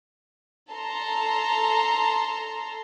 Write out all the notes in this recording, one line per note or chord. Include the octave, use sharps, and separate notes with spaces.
A4 A5 A#5 C6